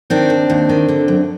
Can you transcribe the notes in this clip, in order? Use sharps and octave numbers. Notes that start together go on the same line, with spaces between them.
D#3 C4 D4
D#2
D#2
D#3
D3
F#2